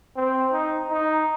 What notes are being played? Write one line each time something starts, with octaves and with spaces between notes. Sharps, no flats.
C4
D#4
D#4